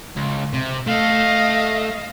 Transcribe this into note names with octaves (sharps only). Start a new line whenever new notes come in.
C#2
C3
A3 D#5 F5